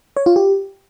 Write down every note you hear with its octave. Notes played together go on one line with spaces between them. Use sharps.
C#5
F4
G4